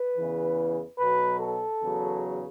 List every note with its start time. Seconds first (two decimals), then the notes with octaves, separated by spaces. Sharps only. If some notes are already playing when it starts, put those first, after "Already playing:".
Already playing: B4
0.17 E2 C#3 E3
0.98 B1 B2 F#3 B4
1.39 A4
1.81 E2 C#3 F#3